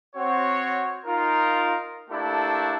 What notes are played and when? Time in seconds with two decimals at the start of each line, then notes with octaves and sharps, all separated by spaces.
0.16 C4 F#4 C#5
1.06 D#4 F4 A#4
2.10 A3 A#3 D4 E4 G4 A4